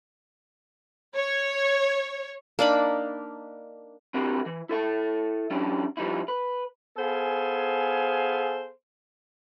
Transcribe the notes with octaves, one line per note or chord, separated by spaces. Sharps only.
C#5
A#3 D4 D#4 B5
C4 D4 E4 F#4 G4 A#4
E3
E4 A4 E5
F#3 C#4 D4 E4 G4
F3 G3 D#4 E4
B4
B3 G#4 A4 C5 F5 G#5